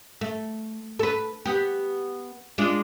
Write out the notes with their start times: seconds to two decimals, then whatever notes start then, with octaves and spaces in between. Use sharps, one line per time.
0.21 A3
0.99 A4 B4
1.45 B3 G4
2.58 G#3 D4 F4